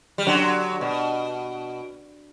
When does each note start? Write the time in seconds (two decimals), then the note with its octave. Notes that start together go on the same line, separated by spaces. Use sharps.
0.18 G3
0.27 D3 F#3
0.81 B2